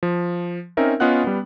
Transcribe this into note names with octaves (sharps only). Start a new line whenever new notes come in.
F3
C4 C#4 D#4 A#4 E5
B3 C#4 F4 D#5 F#5 F#6
G3 B3